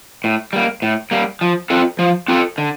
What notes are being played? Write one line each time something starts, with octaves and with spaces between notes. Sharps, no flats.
A2
G3 A#3
A2
G3 A#3
F3
C4 F4 A4
F3
C4 F4 A4
D3